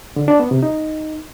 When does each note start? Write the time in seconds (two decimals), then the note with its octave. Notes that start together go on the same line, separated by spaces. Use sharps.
0.16 D3
0.28 D4
0.39 B3
0.51 C3
0.63 D#4